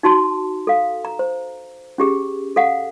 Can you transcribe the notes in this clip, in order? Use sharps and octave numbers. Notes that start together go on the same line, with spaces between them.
D#4 F#4 A5 C6
A4 F5
A#5
C5
C#4 G4 G#4
A4 F5 F#5